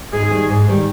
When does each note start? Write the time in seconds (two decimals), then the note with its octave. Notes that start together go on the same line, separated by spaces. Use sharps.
0.12 G#2 G#4
0.31 D#3 G3
0.49 G#2
0.68 D#3 G3